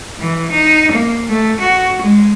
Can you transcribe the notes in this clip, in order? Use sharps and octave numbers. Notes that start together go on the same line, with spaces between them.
E3
D#4
A#3
A3
F#4
G#3